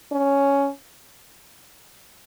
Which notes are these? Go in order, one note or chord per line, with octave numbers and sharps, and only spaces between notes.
C#4